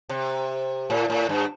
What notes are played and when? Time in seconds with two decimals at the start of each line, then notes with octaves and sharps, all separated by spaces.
0.09 C3
0.90 A2
1.10 A2
1.29 G2